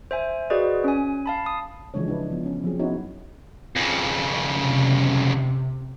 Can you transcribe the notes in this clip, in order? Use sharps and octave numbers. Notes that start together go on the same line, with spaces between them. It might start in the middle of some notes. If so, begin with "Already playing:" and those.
C5 E5 G#5
F#4 G#4 B4 C5 D5 D#5
C#4 G#5
F5 A5 B5
D#6
C#3 E3 F3 G#3 D4 C#5
G#3 D4 E4 B4
F3 B3
C#4
F3 F#3 C4 G#4
B3 C#4 D#4 E4 F#4 C#5
F2 C#3
C3